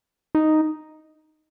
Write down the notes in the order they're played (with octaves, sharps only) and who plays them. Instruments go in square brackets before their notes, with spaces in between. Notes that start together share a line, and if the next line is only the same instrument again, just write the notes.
[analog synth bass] D#4